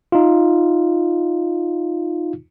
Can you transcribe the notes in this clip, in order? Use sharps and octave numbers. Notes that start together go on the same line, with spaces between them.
D#4 F4